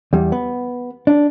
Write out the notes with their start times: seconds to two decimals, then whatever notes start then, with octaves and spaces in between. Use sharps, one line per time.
0.13 E2 G3
0.32 B3
1.07 D4